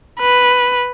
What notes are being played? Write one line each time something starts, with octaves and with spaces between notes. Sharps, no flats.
B4